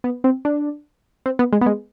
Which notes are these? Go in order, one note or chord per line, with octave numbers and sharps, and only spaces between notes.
B3
C4
D4
C4
B3
G#3
B3
G#3